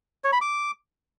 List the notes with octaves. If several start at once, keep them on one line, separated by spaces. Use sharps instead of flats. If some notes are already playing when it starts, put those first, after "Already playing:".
C#5
B5
D6